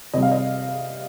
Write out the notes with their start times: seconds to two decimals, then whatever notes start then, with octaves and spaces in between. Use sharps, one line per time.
0.14 C3 G3 D#5
0.22 F5
0.32 D#5